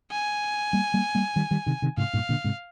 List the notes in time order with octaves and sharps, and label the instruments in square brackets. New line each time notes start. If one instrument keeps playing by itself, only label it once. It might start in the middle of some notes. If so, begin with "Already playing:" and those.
[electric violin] G#5
[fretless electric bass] G3 A#3
G3 A#3
G3 A#3
D#3 G3
D#3 G3
C3 D#3
C3 D#3
[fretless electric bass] G#2 C3 [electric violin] F5
[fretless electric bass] G2 A#2
A#2 D3
G#2 C3